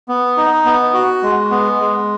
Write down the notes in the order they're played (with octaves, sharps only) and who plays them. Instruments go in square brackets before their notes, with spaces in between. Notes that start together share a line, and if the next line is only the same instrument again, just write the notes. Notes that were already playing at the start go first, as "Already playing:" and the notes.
[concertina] B3
D#4
B3
F#4
G#3
B3
G#3